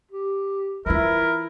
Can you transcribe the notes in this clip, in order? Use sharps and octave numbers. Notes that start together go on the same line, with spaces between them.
G4
E3 E4 F4 A#4 B4 E5